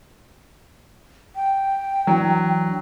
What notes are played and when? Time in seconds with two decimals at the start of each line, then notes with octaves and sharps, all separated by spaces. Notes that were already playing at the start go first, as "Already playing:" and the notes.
1.36 G5
2.07 E3 F#3 D4